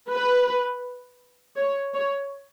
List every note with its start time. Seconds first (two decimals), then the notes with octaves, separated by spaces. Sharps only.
0.10 B4
1.56 C#5
1.93 C#5